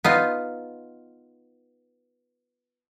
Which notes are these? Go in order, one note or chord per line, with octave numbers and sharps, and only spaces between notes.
B3 D#4 F4